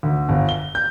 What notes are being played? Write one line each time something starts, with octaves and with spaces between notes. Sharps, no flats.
D2
G1
G7
G6